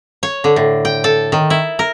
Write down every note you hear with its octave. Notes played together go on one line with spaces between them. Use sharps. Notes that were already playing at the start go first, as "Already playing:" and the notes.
C#5
D3
A2
G5
A4
D#3
E4
A#4